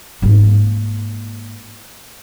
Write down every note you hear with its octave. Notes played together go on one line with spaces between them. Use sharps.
G#2 A#3